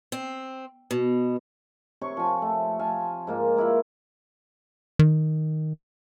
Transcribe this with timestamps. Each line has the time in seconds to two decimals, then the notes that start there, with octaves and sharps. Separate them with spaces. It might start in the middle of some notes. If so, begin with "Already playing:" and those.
0.12 C4
0.91 B2
2.01 C3 C#5 C#6
2.17 F3 G#5
2.42 A3
2.79 F5 G#5 A5
3.27 G#2 A#3 F4
3.57 A#3 E4 F4 B4
4.99 D#3